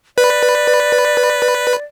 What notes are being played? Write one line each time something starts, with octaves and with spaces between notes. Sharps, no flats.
B4 D5